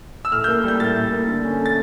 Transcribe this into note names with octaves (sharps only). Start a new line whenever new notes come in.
E6
A2 F6
A#3 G6
G3 G6
A2 A6
A2
A#3
D3
C#4
A3
A6